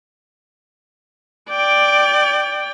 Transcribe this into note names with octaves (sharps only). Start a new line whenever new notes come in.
D5 G5